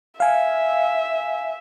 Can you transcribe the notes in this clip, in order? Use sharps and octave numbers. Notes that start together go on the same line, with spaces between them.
E5 F5 G#5